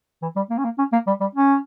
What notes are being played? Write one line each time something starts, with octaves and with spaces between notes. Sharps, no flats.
E3
G3
A#3
C#4
A#3
C#4
A#3
G3
G3
C#4